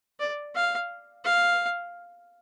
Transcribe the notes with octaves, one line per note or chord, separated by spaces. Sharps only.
D5
F5
F5